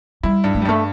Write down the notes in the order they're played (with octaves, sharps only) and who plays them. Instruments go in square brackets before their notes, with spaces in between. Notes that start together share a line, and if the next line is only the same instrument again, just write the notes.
[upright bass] G3 [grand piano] E4
[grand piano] G2
[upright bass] A3
G3
[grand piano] G2 [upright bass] A3